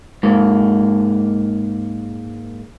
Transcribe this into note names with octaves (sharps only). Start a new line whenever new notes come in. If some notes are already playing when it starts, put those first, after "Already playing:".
G#2 A#3